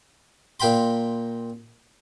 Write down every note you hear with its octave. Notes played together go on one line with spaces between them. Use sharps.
A#2 F5 G5 B5 C6